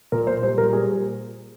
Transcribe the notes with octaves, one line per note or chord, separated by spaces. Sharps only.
A#2 A#4
A#2 C5
G3 C5
A#2 A#4
G3 G#4